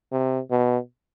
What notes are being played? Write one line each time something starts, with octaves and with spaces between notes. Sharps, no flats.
C3
B2